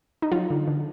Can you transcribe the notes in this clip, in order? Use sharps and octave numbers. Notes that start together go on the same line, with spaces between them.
D#4
F#3 F4
D3
D3